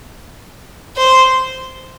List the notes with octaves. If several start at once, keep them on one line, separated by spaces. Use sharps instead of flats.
C5